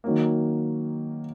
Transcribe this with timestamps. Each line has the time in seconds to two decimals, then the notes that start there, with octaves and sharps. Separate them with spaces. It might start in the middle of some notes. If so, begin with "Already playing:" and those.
0.04 D#3 F#3 A#3